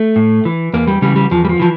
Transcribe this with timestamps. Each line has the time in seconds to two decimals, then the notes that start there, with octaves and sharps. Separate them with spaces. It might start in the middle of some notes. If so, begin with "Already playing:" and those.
Already playing: A3
0.16 A2
0.45 E3
0.74 E2 A#3
0.88 G3
1.02 C#3 E3 G3
1.16 G3
1.31 E2 F3
1.45 G3
1.49 F3
1.60 E3 F3